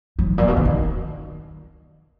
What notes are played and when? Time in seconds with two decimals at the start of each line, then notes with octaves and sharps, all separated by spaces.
0.19 F#3
0.30 G#2
0.38 A#2
0.48 B2
0.56 D3
0.65 D#3